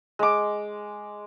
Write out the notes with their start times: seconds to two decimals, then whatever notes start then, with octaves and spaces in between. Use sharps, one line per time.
0.19 G#3 D6